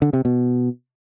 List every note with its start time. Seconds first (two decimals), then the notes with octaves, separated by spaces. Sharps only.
0.02 D3
0.13 C3
0.25 B2